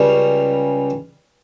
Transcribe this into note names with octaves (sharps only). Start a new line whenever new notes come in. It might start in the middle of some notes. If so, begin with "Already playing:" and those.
Already playing: C#2 C#3 G3 C#4